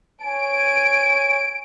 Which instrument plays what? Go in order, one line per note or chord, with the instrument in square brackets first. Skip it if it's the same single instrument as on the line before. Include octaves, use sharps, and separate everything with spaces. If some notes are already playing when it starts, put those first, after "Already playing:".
[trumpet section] C#5 G#5 [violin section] D7